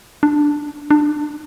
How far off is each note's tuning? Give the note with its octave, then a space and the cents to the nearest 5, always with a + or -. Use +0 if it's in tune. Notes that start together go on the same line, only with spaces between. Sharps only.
D4 +5
D4 +25